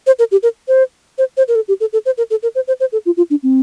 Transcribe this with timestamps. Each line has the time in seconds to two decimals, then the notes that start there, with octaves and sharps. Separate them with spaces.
0.07 C5
0.19 A#4
0.32 G4
0.43 A#4
0.68 C5
1.18 C5
1.37 C5
1.48 A#4
1.55 A4
1.68 G4
1.80 A4
1.93 A4
2.06 C5
2.18 A#4
2.31 A4
2.43 A#4
2.55 C5
2.68 C5
2.80 C5
2.92 A4
3.06 F4
3.17 F4
3.30 D4
3.43 C4